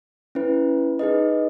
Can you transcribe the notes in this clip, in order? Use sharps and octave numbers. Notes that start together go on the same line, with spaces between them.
C#4 E4 B4
D#4 G#4 B4 D#5